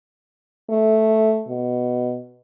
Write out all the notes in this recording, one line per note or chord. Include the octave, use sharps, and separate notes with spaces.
A3
B2